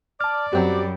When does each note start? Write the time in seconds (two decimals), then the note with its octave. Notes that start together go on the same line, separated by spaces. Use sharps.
0.21 D5 A5 F6
0.53 F#2 F#3 G3 C4 F#4 G4